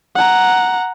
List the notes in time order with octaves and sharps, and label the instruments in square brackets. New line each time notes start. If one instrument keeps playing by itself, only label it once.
[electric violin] F#5 A#5